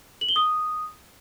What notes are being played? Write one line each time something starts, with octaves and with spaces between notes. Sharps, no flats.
F#7
G7
D#6